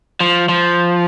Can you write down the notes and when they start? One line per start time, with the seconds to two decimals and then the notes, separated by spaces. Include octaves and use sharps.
0.21 F3
0.49 F3